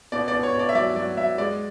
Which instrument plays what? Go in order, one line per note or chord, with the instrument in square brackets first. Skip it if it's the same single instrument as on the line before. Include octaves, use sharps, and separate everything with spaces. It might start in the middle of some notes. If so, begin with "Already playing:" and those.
[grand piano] B2 D5
B2 D5
C#5
B2
D5
E5
F#3 D5
F#3 D5
F#3 E5
G#3 D5